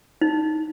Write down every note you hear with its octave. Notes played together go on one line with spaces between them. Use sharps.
D#4